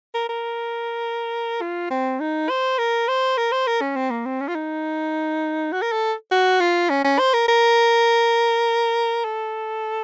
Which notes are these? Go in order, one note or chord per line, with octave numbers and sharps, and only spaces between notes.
A#4
A#4
F4
C4
D#4
C5
A#4
C5
A#4
C5
A#4
C#4
C4
A#3
C4
C#4
F4
D#4
F#4
A#4
A4
F#4
F4
C#4
C#4
C5
A#4
A#4
A4